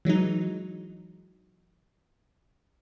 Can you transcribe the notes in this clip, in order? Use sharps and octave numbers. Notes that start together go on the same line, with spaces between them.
E3 F#3 G#3 D#4